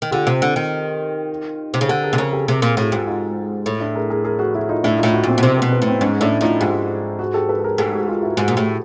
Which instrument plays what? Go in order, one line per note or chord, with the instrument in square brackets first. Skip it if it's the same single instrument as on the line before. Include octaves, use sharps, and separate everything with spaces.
[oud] D#3
[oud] D3 [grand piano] F4 G4
[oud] C3
D3
D#3
C3
C#3
[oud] D3 [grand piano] G4 A4
[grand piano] G#4 A#4
[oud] C3
[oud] C#3 [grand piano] G#4 A#4
[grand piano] G4 A4
[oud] C3 [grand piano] G#4 A#4
[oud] A#2 [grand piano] G#4 A#4
[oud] A2 [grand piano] F#4 G#4
[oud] G#2 [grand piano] F4 G4
[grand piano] D#4 F4
[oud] A2
[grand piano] D4 E4
G#4 A#4
G#4 A#4
G#4 A#4
F#4 G#4
E4 F#4
D#4 F4
[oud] A2 [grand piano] D4 E4
[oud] A2 [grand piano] D#4 F4
[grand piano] E4 F#4
[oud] A#2 [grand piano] C4
[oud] B2
[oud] C3 [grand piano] C4
[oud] B2 [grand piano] B3
[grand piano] B3
[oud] A2
[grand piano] C4
[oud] G#2 [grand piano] C#4 D#4
[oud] A2 [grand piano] D4 E4
[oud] A2 [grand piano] D#4 F4
[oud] G#2 [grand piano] F4 G4
[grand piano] F#4 G#4
G4 A4
A4 B4
A4
G#4 A#4
[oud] G#2 [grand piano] G4 A4
[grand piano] F#4 G#4
G#4
F4 G4
E4 F#4
[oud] G#2 [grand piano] F#4 G#4
[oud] A#2
[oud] A2 [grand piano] G4 A4